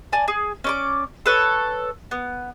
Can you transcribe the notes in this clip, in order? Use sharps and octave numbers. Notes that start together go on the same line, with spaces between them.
D5 G#5 A5
G#4
C#4 D5 D6
A4 B4 C#5
B3